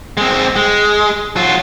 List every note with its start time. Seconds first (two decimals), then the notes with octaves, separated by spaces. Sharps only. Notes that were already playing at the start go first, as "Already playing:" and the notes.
0.17 G#3 C4
0.56 G#3
1.36 F#3 F4